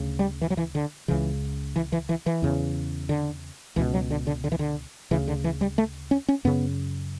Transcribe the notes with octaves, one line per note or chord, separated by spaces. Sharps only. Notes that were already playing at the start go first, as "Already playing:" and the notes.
Already playing: D2 C#3
G3
E3
F#3
E3
D3
C#2 C#3 E3
E3
E3
E3
E3
E2 C#3
D3
C#2 B2 E3
F#3
D3
D3
D3
E3
D3
D2 C#3 E3
D3
E3
G3
A3
C#4
C#4
F#2 C#3 B3